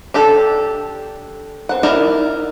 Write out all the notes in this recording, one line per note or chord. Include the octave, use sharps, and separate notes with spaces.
D4 G4 A4
C4 F#5
D#4 E4 A#4 D5